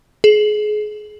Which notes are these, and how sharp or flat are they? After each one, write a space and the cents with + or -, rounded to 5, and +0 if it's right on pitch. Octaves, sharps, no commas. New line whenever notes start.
G#4 +30